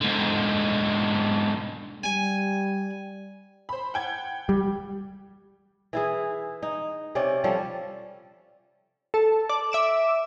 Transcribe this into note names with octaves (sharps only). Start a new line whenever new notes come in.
G#2 D3
G3 G#5
C5 B5
F#5 G5 G#6
G3
E3 E4 G#4
D#4
C3 C#4 D5
F3 G3 C#4 A4
A4
D5
E5 D6 E7